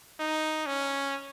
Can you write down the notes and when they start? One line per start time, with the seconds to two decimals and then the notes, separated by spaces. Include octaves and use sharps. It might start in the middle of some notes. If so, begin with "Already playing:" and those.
0.20 D#4
0.66 C#4